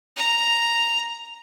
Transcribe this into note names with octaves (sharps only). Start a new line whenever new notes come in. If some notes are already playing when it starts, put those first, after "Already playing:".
A#5